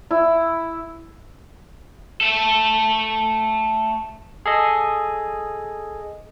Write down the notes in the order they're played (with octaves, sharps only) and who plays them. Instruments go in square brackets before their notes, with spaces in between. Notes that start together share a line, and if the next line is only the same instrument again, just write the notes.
[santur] E4
[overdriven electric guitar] A3 A4
[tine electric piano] G#4 A4 D#5